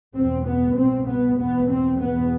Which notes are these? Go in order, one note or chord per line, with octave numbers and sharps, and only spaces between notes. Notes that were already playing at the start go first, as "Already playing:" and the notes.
E2 B2 C4
B3
C2 B2 C4
B3
E2 B2 B3
C4
E2 B2 B3